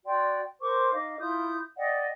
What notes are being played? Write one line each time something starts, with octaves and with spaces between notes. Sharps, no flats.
F#4 D5 G5 C6
A#4 C5 C#6 D6
D#4 D#5 F5 D6
E4 F4 D#6 G6
D5 D#5 F#5 G5